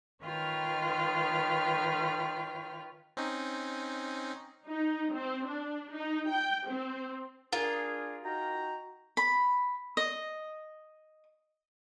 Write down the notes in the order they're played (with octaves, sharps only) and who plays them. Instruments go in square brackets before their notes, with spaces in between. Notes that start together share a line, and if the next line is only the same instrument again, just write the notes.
[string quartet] D#3 F4 B4 C#5 G5 F6
[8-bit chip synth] C4 C#4 D#4
[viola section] D#4
C4
D4
D#4
G5
C4
[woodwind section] D4 G#4 [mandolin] F4 [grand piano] A#4
[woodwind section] D#4 G5 A#5 [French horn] F#4
[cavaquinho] B5
D#5